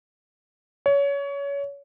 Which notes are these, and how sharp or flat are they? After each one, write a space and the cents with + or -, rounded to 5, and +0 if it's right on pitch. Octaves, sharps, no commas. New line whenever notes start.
C#5 +25